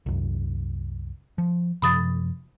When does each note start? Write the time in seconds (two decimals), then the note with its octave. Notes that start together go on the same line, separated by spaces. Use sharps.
0.06 C2 F#2
1.38 F3
1.82 F#2 C3 F3 B5 D#6 A6